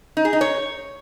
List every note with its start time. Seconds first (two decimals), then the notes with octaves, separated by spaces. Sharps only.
0.17 D#4
0.25 G#4
0.33 D#4
0.41 C#5